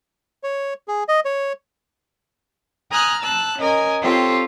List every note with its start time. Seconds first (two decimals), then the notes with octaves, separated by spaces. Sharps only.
0.44 C#5
0.88 G#4
1.08 D#5
1.25 C#5
2.90 G#5 A#5 D#6 F6 F#6
3.20 A5 E6 F#6
3.58 C#4 A#4 D#5 G#5
4.01 C4 F4 G4 A4 C5 C#5